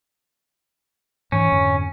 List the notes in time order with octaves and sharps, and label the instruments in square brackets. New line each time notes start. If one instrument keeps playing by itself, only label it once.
[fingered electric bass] G#2 E3 [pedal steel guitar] C#4
[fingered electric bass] F2 G#2 D3